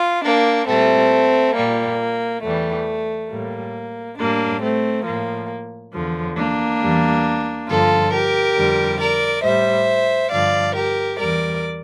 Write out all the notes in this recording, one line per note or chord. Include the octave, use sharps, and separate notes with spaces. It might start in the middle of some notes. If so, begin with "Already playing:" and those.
Already playing: F4
A#3 D4
A#2 G3 A3 C4
A#2 G3 A#3
E2 E3 G3 A3
A2 G3 A#3
A2 G3 A#3 D4
A3 C4
A2 F3 A#3
E2 D3 F3
A#3 D4
E2 E3 G3
G2 D3 F3 F4 A4
G4 A#4
F2 D3 G3
A#4 D5
A2 G3 C5 E5
G2 D3 F3 D5 F5
G4 A#4
E2 E3 G3 A#4 D5